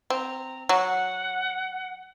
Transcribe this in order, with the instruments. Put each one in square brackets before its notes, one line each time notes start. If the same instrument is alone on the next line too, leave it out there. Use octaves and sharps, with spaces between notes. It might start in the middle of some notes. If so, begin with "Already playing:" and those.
[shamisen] C4 [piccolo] A#5
[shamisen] F#3 [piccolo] F#5